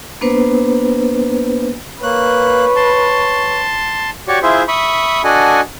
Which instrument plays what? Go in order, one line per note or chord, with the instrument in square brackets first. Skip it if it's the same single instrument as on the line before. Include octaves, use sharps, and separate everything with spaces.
[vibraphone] A#3 B3 D4 B4 C5
[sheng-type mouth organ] A#3 F#6 [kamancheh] B4 [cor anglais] C#5
[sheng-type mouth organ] A5 C6
F#4 G4 C#5 D5 C#6
E4 F4 G#4 C5 E5
E5 B5 C#6 D#6
D4 F#4 A4 D#5 F#5 G#5